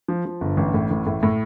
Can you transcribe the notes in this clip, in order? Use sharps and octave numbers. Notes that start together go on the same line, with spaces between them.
F3
F3
G1
A1
A2
A1
A2
A2